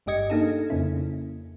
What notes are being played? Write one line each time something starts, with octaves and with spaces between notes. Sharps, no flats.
G1 G2 G4 D#5 G#6 C#7
A#3 D4 D#4 G#4 A4
F2 C#3 A#3 C#4 E4